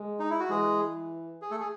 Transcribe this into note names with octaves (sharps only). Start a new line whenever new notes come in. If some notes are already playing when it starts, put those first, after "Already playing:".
Already playing: G#3
D#4
E4
F#4
E3 G#3 G#4
G#4
A3 A4
G#4